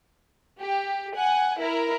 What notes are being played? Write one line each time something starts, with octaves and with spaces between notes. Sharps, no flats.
G4
F#5 G#5
E4 A#4